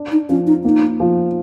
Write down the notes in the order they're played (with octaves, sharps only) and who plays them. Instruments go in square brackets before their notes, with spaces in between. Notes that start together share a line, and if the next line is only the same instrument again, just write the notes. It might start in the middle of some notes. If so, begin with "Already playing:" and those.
Already playing: [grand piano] D4
[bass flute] D#4
[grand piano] F3 [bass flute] C#4
[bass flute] D#4
[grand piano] A#3 [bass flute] D#4
[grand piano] F3